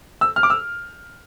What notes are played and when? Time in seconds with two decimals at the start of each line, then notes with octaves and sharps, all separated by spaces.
0.21 E6
0.36 F6
0.43 D6
0.50 E6